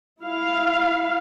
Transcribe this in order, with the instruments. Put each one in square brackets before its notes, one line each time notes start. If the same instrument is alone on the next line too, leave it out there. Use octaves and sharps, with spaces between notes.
[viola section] E4 F5